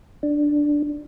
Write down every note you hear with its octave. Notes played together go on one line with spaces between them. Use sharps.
D4